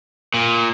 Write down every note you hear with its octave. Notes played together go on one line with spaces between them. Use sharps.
A#2